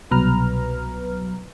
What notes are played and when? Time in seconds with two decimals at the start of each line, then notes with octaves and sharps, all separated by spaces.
0.11 C2 B2 F#3 B4 A#5 F6